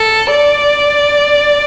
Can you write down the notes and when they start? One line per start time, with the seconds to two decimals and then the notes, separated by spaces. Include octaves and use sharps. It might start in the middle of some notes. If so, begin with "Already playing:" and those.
Already playing: A4
0.31 D5